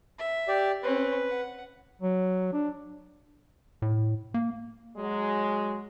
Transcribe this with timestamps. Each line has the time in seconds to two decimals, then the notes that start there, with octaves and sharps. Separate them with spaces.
0.18 E5
0.48 G4 D5
0.83 C4 C#4 B4
1.27 F#5
2.02 F#3
2.53 D4
3.82 A2
4.34 A#3
4.96 F#3 G#3